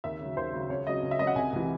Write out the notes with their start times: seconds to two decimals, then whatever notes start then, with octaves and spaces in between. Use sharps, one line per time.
0.04 D#2 E5
0.20 C#3 F#3
0.37 D#2 C5
0.53 C#3 F#3
0.70 C#2 C#5
0.87 C#3 F#3 D#5
1.02 C#2
1.11 E5
1.19 C#3 F#3 D#5
1.27 F#5
1.35 C2 G#5
1.53 C3 E3